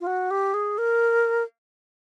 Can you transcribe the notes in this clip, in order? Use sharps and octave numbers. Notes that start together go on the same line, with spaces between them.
F4
F#4
G4
G#4
A#4